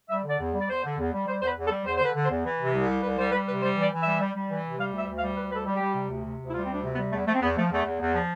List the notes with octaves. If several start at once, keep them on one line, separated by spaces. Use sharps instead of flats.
G3 E5
D3
D5
E2
G3
D5
E2 C5
D3
E2
G3
G3 C5
E2 B4 C5
E2
A4
G3
E2 C5
C5
D3 B4
D3
C5
E2
E3
C3
C2
G3
C2 B4
G3 C5
G3 B4
C3 B4
G3 C5
E3
D5
E3
E5
G3
G3
G3
E3
C3
G3 F5
D2
E5
D2
F5
G3
D2 B4
G3 A4 B4
G3
G4
G3
C3
D2
C3
D2
E4
G3 F4
C4
D2 D4
C3
B3
G3
E2 A3
F3 A3
C4
E2 B3
F3 A3
E2 A3
E2
E2
F3